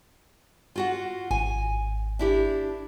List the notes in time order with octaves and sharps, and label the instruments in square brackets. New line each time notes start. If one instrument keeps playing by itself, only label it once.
[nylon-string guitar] F4 F#4 F#5
[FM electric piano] G#1 [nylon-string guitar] G#5
[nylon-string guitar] D4 E4 G4